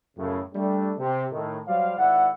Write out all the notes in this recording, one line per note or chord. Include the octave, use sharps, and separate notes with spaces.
F#2 A2 C#3
G3 A3 D4
C3
A2 D#3
F#3 G3 C5 D5 F5
G#1 E4 D5 E5 F#5